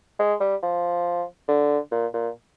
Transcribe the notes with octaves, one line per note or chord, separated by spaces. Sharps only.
G#3
G3
F3
D3
A#2
A#2